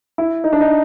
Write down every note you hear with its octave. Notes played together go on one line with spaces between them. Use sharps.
E4
D#4
D4
D#4